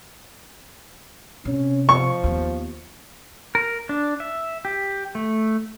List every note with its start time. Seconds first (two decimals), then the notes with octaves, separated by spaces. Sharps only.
1.45 C3 C#4
1.89 F3 C#6
2.24 D#2 B3
3.55 A#4
3.89 D4
4.20 E5
4.65 G4
5.15 A3